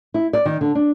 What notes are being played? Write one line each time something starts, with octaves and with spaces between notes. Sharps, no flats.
E4
D5
D#3
D3
D4